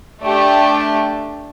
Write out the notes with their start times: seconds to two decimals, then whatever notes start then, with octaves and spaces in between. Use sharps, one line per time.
0.22 A3 D4 G4